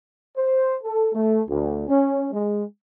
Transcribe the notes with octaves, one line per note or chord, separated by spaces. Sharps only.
C5
A4
A3
D2
C#4
G#3